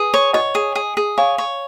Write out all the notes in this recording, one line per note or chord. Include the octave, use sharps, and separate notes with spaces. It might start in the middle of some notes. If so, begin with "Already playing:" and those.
Already playing: G#4 B4
C#5
C#5 D#5 F#5
G#4
G#4
G#4
C#5 F5 G#5
C#5